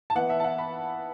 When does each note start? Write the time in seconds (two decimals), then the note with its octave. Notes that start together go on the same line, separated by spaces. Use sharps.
0.10 A5
0.15 E3 B3 F#5
0.30 E5
0.40 A5
0.44 F#5
0.58 B5